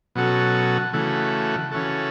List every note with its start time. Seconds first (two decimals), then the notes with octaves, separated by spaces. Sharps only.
0.15 B2 F#3 C#4 F#4 A4
0.93 C#3 E3 A3 F#4
1.71 C#3 E3 C#4 F#4 A4